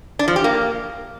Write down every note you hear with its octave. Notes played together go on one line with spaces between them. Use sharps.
D4
F3
G4
A#3